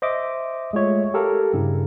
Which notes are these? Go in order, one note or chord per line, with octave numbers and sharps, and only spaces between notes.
C5 D#5 E5 D6
G#3 A3 F4 C#5 E5
G4 A4 A#4 F5
G2 C#3 E4